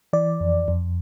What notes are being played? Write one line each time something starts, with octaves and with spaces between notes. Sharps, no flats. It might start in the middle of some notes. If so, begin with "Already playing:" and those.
E3 D5
F2
F2